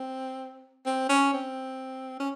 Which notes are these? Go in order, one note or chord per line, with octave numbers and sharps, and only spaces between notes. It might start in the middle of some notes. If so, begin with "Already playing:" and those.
Already playing: C4
C4
C#4
C4
C#4